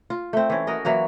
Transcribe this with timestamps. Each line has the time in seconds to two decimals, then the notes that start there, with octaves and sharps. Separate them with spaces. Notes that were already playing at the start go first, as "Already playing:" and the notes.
0.10 F4
0.33 A3 C4
0.50 E3 C#4
0.67 F#4 A#4 D#5
0.85 E3 F#3 A#3 F#4